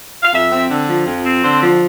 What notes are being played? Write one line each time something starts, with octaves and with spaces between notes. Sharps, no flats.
F5
F2 E5
C4
D3
F3
F2
C4
D3 C5
F3